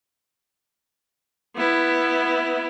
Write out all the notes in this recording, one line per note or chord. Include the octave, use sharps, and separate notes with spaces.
B3 E4